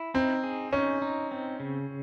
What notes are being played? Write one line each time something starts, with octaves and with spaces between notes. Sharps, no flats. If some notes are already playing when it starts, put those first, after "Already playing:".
Already playing: E4
C4 D#4
G#4
C#4 D#4
D#4
C4
C#3